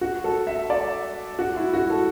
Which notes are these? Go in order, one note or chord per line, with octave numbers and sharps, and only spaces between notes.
F#4
A4
E5
D5
F#4
E4
F#4
A4